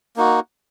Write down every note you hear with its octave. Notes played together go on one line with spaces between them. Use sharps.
A#3 D#4 F#4